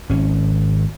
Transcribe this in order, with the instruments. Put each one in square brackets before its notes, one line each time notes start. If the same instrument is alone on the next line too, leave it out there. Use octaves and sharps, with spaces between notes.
[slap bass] G#1 C#4